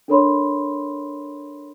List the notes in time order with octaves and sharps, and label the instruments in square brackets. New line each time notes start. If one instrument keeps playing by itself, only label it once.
[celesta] D4 A4 A#4 C#5 B5 C6